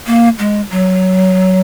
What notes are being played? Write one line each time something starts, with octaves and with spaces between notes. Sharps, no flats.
A#3
G#3
F#3